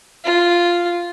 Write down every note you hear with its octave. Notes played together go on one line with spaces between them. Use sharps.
F4